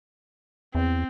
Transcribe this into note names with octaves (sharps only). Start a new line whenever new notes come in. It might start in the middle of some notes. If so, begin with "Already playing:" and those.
E2 C4